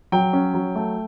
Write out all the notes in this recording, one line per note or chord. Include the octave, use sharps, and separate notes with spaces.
F#3 G5
C#4
F#3
A3